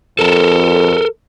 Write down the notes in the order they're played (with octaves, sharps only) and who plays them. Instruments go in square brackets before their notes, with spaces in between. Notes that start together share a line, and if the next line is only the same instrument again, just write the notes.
[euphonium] F2 [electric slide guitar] A4 A#4